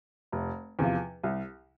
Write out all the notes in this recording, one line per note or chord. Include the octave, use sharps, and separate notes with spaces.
F1
E2 C3 F3
C2